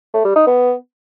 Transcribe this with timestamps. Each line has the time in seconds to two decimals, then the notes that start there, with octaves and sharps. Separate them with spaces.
0.14 A3
0.25 G3
0.36 D#4
0.47 B3